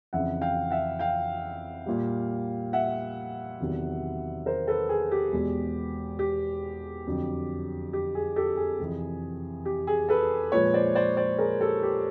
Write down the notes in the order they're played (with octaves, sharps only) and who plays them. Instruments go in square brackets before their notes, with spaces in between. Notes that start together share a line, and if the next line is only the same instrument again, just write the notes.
[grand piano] F2 C#3 E3 E5 F#5
F5 G5
E5 F#5
F5 G5
A#2 G3
E5 F#5
E2 C3 D#3 F#3
A#4 C5
A4 B4
G#4
G4
E2 B2 G#3
G4
F2 D3 F#3
G4
G#4
G4 A4
G#4
F2 C3 E3
G4
G#4
A4 B4
A#2 F3 G#3 B4 C#5
C5 D5
C5 D5
C5 D5
G#4 A#4
G4 A4
G4